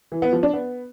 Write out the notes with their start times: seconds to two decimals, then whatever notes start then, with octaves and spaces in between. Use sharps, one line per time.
0.12 E3
0.22 B3
0.33 F3
0.43 D4
0.53 B3